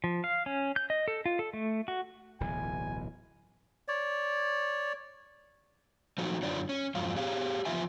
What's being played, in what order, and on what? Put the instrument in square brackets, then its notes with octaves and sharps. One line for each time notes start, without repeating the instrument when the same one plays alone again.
[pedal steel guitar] F3
F5
C#4
G6
D#5
A4
F4
A4
A3
F#4
[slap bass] D1 B1 E3 [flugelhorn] G#5
[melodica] C#5 D5
[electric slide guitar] F3 F#3 A3 C4 D#4 F#4
F#2 D3 F4 C#5 D5
C#4
F2 G#2 F#3 F4
G4 G#4 C#5 F5
E2 G#2 F3 F4 E5 G#5